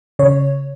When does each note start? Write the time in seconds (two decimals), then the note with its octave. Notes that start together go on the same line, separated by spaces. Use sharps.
0.19 C#3 C#5